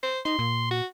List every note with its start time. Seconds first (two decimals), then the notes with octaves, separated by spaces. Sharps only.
0.03 C5
0.25 D#4 C6
0.39 A#2
0.71 F#4